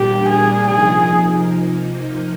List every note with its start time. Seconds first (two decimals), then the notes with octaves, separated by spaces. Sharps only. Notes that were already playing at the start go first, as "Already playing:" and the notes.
Already playing: A#2 G3 A#3 D4 G4
0.29 G#4
0.68 C3 F3 A#3 D#4 G#4